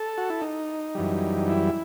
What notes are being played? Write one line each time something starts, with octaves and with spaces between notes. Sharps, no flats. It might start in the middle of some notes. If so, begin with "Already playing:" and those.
Already playing: A4
F#4
E4
D#4
F#2 E3 G3
E4